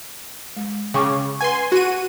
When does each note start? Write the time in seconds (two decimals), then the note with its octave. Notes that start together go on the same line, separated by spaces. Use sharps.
0.56 G#3
0.94 C#3 G5 C#6 D6
1.41 B4 F#5 G#5 C6
1.72 F#4 D#7